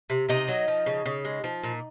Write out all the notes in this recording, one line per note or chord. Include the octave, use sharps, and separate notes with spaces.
C3
C3 D#4 D#5
F#3
F3
C#3
C#3
G#3
F3
A#2